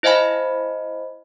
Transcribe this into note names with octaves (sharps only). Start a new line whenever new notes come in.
E4 C5 D#5 F5 G#5 B5